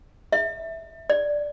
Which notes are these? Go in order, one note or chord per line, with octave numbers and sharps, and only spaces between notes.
E5
D5